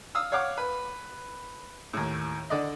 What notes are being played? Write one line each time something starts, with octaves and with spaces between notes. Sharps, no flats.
F5 D#6 E6
C#5 F5 F#5 D6
B4
D#2 A2
D3 D5 D#5